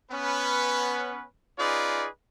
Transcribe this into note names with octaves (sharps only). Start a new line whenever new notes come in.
B3 C#4 B4
C#4 D#4 F4 G#4 B4 D5